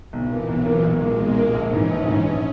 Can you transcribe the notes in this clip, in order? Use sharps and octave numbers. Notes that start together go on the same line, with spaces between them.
B1 E3
A#2 A#3
B1 F#3
A#2 A#3
B1 G#3
A#2 A#3
B1 A#3
A#2 A#3
A#1 C#4
G#2 E3
A#1
G#2 E3
A#1